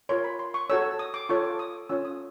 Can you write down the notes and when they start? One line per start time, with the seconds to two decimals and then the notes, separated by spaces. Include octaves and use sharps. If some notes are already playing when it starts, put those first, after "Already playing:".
0.09 F4 A#4 C#5 C6
0.24 B5
0.39 C6
0.54 C#6
0.70 F#4 A4 C#5 E6
0.99 D#6
1.14 D6
1.29 F4 A4 C#5 C#6
1.44 D6
1.59 D#6
1.89 C#4 F4 A4 C#5 E6
2.05 D#6